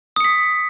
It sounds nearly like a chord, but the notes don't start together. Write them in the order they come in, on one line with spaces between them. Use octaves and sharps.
D#6 C#7 B6